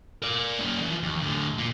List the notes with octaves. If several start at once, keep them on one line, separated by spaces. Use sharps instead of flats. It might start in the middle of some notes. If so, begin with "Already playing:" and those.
A#4 D5
A#3 C#4
E3 F3
D#2
A2 D3
A#2